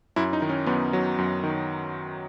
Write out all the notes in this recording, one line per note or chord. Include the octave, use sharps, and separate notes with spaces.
F#2 E4
D#4
D#3
C#4
F#2 B3
F#3
F#2
D#3